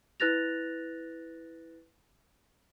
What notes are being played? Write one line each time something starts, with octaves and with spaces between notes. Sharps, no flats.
E4 B4 F#6 A6 A#6 F7